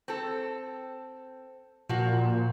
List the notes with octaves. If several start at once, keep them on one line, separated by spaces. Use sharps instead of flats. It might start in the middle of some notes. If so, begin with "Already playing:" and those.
C4 A4
A#2 F3 F#4